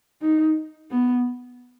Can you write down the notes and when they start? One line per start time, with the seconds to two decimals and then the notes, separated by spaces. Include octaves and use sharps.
0.22 D#4
0.91 B3